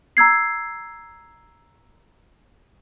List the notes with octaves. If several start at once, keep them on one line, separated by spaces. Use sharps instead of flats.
A#5 E6 G#6 C7